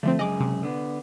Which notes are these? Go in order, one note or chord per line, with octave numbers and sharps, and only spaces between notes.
D3 F3 A3 C4
C#2 F#2 G#4 D#5 D6
C3
D3 B3